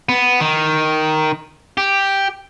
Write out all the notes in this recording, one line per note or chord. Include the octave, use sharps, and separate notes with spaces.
B3
D#3
G4